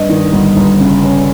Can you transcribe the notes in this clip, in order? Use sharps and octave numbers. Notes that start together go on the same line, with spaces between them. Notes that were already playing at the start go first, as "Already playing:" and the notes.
Already playing: G2 D#5
D#3
G1
G1
C#3
C#4